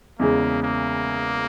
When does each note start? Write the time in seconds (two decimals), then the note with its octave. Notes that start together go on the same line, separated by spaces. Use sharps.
0.20 E2 C#3 G#3 A#3
0.63 A#3